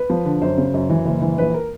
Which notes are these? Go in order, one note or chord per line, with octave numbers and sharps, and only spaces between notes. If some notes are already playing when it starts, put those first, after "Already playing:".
Already playing: B4
F3
D3
F#2 C5
C#3
F#2
E3
F#1
E3
A#1 B4
A#4